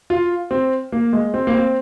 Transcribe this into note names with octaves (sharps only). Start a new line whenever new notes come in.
F4
C4
A#3
G#3
C4
A#3
C4